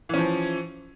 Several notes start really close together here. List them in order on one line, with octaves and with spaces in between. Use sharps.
E3 C#4 F3